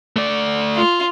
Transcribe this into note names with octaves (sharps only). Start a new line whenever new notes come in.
A3 D5
F4